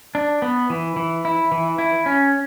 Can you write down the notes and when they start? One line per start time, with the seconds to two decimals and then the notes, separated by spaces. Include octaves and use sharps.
0.15 D4
0.42 B3
0.70 E3
0.96 E3
1.25 E4
1.52 E3
1.78 E4
2.06 C#4